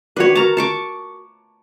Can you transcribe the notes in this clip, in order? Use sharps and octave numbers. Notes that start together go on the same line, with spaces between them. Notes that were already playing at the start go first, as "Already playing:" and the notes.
D4 F#4 B4 C#5 F#5
F#4 A#4 A5 A#5
A5 C#6 D6